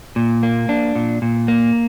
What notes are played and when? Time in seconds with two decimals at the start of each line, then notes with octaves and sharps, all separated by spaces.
0.16 A#2
0.43 A#3
0.69 D4
0.95 A#2
1.22 A#2
1.48 A#3